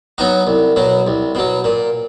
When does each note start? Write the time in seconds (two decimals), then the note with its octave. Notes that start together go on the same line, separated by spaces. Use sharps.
0.18 F#3 B3 D#4 F#4
0.47 C2
0.76 B2 F#3
1.07 C2
1.35 B2 F#3
1.64 A#2